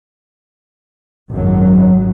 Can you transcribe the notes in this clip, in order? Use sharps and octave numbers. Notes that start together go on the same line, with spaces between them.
G#1 F#2 F#3